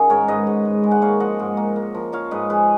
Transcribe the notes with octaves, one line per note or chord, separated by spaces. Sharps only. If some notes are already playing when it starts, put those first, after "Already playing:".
Already playing: D#3 C#4 F#4 G#4
G#2 A#4 C#5
G#2 B4 D#5
G#2
G#2
G#3
F#5
A#3 C#5 F5
F3 D#5 F#5
G#2
A#3
A#3
F3
F3 C#5 F5
G#2 B4 D#5
F3 G#4 B4